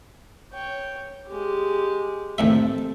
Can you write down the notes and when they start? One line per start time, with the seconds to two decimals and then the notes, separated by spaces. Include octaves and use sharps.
0.53 C#5 G5
1.27 G#3 G4
2.38 D#2 A2 C4 A4 E5